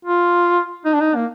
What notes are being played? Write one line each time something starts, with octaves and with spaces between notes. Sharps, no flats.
F4
D#4
D4
D#4
A#3